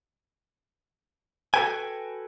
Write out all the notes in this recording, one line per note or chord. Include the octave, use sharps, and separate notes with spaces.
F#4 G4 A4 B4 G5 G#5